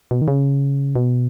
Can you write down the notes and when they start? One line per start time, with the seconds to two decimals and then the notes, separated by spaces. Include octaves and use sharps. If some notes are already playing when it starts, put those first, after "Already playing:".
0.11 B2
0.22 D#3
0.28 C#3
0.96 B2